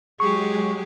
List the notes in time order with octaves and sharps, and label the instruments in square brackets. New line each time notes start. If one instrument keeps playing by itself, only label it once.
[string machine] F#3 G#3 [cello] G4 G#4 [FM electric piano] C#6